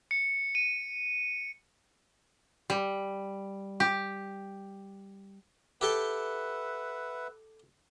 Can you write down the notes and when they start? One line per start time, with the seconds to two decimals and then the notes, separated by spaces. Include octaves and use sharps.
0.11 C#7
0.55 D#7
2.70 G3
3.80 G4
5.81 G4 A4 B4 E5 F#5 G5